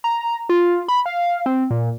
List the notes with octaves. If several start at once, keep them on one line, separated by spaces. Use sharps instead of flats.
A#5
F4
B5
F5
C4
A#2